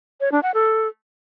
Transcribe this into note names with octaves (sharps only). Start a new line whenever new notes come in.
C#5
D4
F#5
A4